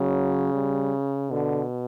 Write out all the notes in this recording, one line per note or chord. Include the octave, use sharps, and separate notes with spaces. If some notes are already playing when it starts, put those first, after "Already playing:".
Already playing: C#3 F#3
G3
B2 D3